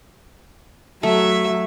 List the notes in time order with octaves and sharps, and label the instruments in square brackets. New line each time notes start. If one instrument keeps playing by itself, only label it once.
[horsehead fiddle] F#3 [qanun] A3 [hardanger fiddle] E5